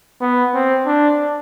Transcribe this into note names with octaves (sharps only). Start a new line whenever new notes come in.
B3
C4
D4